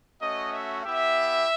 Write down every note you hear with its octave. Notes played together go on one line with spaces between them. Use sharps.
A3 C#4 F#4 D#5
E5
B3 E4 G4 E5